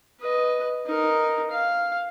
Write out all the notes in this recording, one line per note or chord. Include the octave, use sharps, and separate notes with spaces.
B4 D#5
D#4 A#4
F5